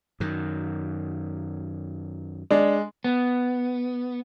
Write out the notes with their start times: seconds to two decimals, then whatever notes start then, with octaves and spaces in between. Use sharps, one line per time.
0.20 F#2 D#3
2.51 G#3 D4
3.04 B3